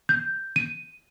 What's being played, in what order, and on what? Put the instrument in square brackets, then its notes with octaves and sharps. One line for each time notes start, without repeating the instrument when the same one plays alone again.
[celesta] G6
D#7